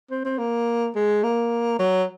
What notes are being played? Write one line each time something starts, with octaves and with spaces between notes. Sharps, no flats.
C4
C4
A#3
G#3
A#3
F#3